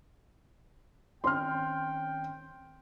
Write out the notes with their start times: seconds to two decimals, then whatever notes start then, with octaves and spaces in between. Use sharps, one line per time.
1.24 D#3 C4 C#4 G5 C6 F6